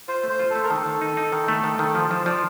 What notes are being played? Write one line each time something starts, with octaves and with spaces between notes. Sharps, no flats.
F4 C5
A3
C5
F4
A4
A3
A#4
D#3 A4
D#3
D#4
D#4
D#3
A3
D#3
D#3
F3 F4
F3 C5
F3 D5